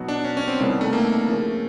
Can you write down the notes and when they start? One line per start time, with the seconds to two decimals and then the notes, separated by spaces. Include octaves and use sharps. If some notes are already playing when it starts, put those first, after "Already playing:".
Already playing: B2 F#3 B3 D#4 F#4
0.08 D4
0.24 C#4
0.37 C#4
0.48 C4
0.59 C2 C3 D#3 G3 B3
0.81 A3
0.93 A#3
1.26 C#3 F3 A#3 C#4